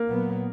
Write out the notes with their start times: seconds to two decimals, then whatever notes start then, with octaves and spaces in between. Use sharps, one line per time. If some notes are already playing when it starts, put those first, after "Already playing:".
Already playing: A#3
0.09 A#2 F#3 B3